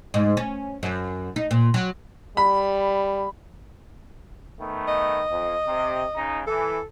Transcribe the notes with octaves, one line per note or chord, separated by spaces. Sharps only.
G#2
C#4
F#2
D#4
A#2
F#3
G3 B5
D#3 A3 B3
D#5
F2
C3
C#3 D#4
E3 A4